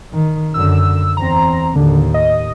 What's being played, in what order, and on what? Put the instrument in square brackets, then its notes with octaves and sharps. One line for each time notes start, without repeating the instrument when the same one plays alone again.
[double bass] D#3
[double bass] F#2 D3 [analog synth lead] E6
[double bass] E2 C4 [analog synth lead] A#5
[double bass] D#2 A2 [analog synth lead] D3
[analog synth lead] D#5